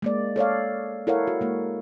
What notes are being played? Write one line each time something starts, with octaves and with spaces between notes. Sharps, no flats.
G#3 A#3 D5
A4 C#5 D5 F5
E4 A4 A#4 C#5 F5 F#5
F#4
G#3 A#3